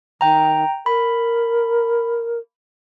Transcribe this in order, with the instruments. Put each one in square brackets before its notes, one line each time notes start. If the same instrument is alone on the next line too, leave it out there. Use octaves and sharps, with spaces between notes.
[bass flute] D#3 [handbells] G5 A#5
[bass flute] A#4 [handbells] B5